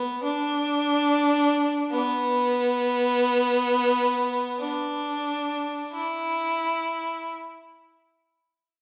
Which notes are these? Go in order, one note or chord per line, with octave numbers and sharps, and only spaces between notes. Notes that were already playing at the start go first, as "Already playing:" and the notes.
Already playing: B3
D4
B3
D4
E4